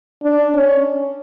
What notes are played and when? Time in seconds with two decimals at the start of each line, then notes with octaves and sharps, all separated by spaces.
0.23 D4
0.54 C#4